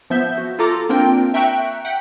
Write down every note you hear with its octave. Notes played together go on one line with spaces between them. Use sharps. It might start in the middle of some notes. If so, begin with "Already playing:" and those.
F3 B3 E5 G6
F#4
F4 A4 A#5 D6
A#3 C4 D4 F4 A#4 G5
E5 G5 A#5 C#6 F#6
F#5 G5 B6